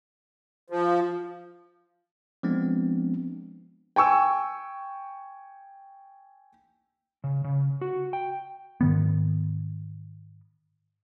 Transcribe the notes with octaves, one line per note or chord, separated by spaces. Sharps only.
F3
F3 G#3 B3 C4 D4
G5 G#5 C#6 E6
C#3
C#3
F#4
G5
G#2 D#3 B3